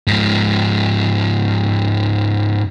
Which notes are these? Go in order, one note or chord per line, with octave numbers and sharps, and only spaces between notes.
G#2 F3